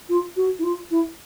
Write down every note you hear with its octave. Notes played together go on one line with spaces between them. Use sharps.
F4
F#4
E4
F4
E4